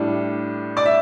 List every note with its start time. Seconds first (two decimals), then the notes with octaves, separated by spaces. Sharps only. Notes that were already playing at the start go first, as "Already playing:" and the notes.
Already playing: A2 G3 D4
0.77 D5
0.86 E5